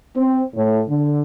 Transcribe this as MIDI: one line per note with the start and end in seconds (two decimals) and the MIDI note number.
0.17 0.41 60
0.55 0.82 45
0.88 1.21 50